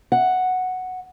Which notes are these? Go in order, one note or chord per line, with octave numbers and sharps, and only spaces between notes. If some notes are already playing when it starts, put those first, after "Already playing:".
F#5